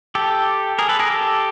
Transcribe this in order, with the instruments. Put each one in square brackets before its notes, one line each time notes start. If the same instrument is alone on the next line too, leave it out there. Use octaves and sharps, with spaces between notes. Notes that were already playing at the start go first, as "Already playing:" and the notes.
[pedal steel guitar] G4 A4
G#4 A#4
A4 B4
G#4 A#4
G4 A4